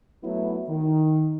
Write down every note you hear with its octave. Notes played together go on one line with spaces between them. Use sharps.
F#3 A3 B3 E4
D#3